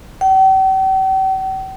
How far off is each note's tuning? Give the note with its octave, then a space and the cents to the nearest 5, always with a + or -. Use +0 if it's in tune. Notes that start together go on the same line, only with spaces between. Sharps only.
G5 -45